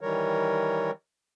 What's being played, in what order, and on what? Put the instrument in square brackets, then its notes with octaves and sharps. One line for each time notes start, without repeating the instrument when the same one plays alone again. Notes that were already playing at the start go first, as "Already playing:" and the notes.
[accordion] D#3 E3 G3 A#4 C#5